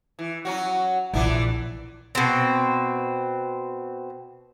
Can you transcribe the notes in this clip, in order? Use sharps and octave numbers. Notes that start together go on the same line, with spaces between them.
E3
F#3 C#4 F#4
A#1 E3 D4 E4
B2 C4